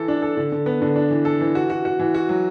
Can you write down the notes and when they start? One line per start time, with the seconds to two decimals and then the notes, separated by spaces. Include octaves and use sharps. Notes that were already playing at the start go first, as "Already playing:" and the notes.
Already playing: E3 A4
0.08 D4
0.22 A4
0.37 D3
0.52 D3
0.66 B3
0.82 D3
0.96 D4
1.11 E3
1.25 A4
1.41 E3
1.55 F#4
1.70 F#4
1.85 F#4
2.00 E3
2.14 F#4
2.29 F#3